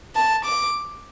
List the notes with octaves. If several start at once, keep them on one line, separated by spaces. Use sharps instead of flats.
A5
D6